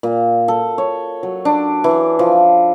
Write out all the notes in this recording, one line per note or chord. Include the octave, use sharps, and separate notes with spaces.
A#2
A4
C#5
F#3
D4
E3
F3